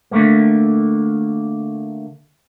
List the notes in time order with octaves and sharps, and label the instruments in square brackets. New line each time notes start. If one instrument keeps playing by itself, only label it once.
[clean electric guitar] D3 A3 A#3